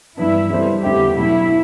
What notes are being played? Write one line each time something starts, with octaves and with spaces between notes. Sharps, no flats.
G2 E3 B3 D4 E4
G3 B3 E4 A4 C5
E2 D3 A3 E4 G4 A4
B2 F#3 A3 E4